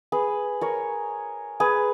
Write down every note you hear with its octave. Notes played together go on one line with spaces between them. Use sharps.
G#4 B4
A#4 C#5
G#4 B4